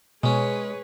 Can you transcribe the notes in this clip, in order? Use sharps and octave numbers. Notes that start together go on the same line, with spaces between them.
B2 G#3 C#4 G#4 B4 C#5